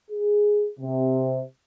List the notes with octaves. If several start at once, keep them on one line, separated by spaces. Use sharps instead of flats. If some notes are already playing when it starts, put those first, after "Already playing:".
G#4
C3